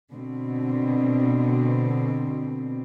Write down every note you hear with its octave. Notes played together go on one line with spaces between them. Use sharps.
B2 D3 C4